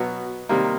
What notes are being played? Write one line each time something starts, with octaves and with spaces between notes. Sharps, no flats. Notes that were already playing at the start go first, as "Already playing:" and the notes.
Already playing: B2 F#3 B3 F#4
C3 D#3 G3 A#3